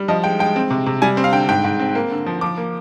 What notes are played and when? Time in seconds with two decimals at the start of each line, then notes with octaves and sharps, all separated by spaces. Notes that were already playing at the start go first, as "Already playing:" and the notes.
Already playing: G3
0.08 F3 D#5
0.24 G#3 G5
0.39 G#3 G5
0.56 C4
0.70 C3
0.86 C3
1.02 G3 G#5
1.17 C4
1.24 F5
1.32 D3 G5
1.49 G#2 G5
1.64 G#2
1.80 C4
1.95 A#3
2.11 D3
2.26 F3
2.41 F3 D6
2.57 A#3